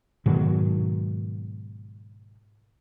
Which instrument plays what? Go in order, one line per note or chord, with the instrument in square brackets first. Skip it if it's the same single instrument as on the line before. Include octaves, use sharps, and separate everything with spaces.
[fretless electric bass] G#2 B2 D#3 F#3